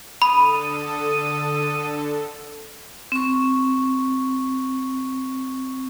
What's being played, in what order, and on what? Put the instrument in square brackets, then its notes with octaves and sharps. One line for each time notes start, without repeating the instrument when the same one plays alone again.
[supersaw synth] D3 A4 [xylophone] B5 [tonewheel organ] D#6
[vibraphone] C4 C#6